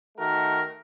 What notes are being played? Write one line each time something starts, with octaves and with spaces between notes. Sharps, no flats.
D#3 A3 F#4 A#4